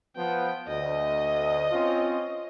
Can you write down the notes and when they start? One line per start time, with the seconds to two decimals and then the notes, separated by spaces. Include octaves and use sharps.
0.16 F3 B3 G5
0.69 D2 D#5
1.72 C4 C#4 F4